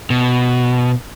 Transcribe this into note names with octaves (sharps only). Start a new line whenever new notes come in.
B2